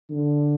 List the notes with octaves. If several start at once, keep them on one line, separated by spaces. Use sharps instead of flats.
D3